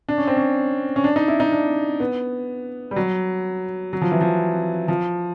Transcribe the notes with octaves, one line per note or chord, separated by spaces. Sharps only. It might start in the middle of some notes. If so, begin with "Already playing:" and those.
D4
C#4
C4
C#4
C#4
D4
D#4
E4
D#4
D4
B3
G3
F#3
F#3
F3
E3
F3
F3